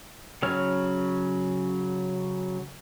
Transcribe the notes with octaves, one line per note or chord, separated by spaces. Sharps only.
C#3 F#3 C#5 F6